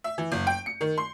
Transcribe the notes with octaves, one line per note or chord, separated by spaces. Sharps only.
E5
E3
F#1
G5
C#7
D#3
C6